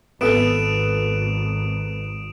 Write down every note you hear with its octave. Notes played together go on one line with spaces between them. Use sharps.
G#1 B3 A4 D#6 D7 E7